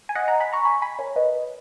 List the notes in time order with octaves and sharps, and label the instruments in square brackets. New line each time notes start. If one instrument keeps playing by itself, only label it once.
[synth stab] G#5
D#5 F#5
F#5 A#5
G#5 B5
A#5 C#6
G#5 B5
G#5 B5
A#4 C#5
B4 D#5